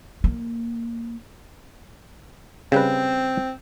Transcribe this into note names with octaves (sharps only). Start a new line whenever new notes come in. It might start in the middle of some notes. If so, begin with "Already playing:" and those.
A#3
C#3 G3 C4 B4